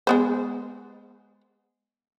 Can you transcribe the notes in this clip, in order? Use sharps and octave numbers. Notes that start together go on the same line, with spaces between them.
G#3 B3 C5